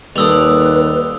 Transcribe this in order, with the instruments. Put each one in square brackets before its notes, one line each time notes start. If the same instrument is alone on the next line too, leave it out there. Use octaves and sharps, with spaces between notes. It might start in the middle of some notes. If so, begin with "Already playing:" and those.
[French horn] D#2 [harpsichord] D3 G3 [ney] B4 [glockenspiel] D#6 E6 F7